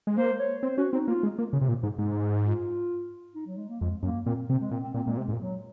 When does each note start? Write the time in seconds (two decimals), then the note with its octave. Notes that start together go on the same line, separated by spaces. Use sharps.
0.07 G#3
0.17 A#3 C5
0.39 C#5
0.63 C4 C5
0.77 C#4 F#4
0.93 C4 D#4
1.08 A#3 F4
1.23 G#3
1.39 A#3
1.53 C#3
1.61 C3
1.69 A#2
1.83 G#2
1.99 G#2
2.45 F4
3.35 D#4
3.47 F#3
3.57 G#3
3.69 A#3
3.80 F2 G#3
4.03 F#2 A#3
4.26 A#2 C4
4.48 C3 C4
4.60 G#3
4.71 A#2 C4
4.83 C4
4.94 A#2 C4
5.05 A#2 G#3
5.17 C3 G#3
5.28 G#2
5.32 A#2
5.40 F#3